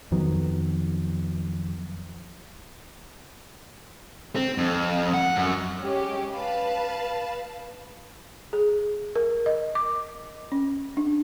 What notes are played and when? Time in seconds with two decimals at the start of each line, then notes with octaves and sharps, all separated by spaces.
0.12 F2 D#3 F#3 B3
4.36 C4
4.58 F2
5.14 F#5
5.36 F#2
5.80 G#3 C#4 G4
6.31 B4 F5 A5
8.53 G#4
9.15 A#4
9.46 D#5
9.75 D6
10.52 C#4
10.97 D4